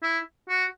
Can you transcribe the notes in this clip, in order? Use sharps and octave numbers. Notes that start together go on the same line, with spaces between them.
E4
F#4